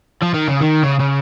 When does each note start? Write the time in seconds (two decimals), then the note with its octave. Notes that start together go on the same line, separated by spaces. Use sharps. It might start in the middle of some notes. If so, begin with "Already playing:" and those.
0.22 F3
0.34 D#3
0.48 C#3
0.61 D#3
0.84 C#3
1.00 C#3